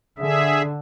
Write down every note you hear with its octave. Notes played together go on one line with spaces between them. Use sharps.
D3 G#4 E5